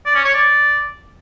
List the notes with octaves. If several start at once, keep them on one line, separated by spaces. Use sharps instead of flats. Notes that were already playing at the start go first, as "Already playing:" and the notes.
D5
C#4
C#5
D5